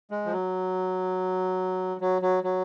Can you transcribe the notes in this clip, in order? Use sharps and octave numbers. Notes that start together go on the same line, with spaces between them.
G#3
F3
F#3
F#3
F#3
F#3